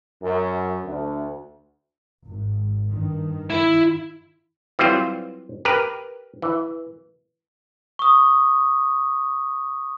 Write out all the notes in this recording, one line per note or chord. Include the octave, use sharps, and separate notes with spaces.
F#2
D2
G#1
G2 D#3
E4
E3 F#3 G3 C4 F4 C5
G4 A#4 B4
E3
C#6 D#6